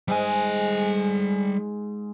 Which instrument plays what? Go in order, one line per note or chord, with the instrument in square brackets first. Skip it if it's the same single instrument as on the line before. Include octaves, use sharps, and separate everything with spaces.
[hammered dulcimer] G#2 G#3 [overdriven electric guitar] G3 G#5